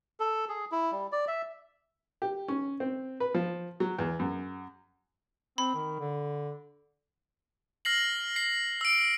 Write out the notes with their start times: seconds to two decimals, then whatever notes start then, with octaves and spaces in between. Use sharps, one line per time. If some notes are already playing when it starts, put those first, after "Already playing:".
0.20 A4
0.49 G#4
0.72 E4
0.91 G3
1.12 D5
1.28 E5
2.22 G4
2.48 C#4
2.80 C4
3.20 B4
3.34 F3
3.80 F#3
3.99 E2
4.19 F#2
5.58 C4 B5
5.75 D#3
6.00 D3
7.85 F6 A#6 C7 F#7
8.36 C7
8.81 E6 D7